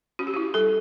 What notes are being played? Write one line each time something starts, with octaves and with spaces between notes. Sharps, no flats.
C#4 F#4
G4
E4 F#4
G3 A4